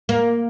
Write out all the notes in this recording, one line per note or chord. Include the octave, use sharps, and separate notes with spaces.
A#3